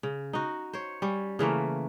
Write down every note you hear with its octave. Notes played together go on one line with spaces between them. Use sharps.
C#3
D#4 F#4
C5 C#5
G3 C#4
C#3 E3 A3 A#3